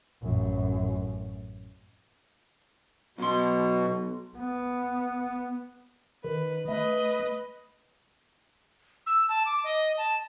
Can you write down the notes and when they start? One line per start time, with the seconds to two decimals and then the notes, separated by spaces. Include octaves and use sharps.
0.22 A1 F#2
3.18 B1 B2 F#3 C6
4.37 B3
6.24 D#3 B4
6.68 A3 B4 D#5
9.06 E6
9.29 A5
9.46 D6
9.64 D#5
9.98 A5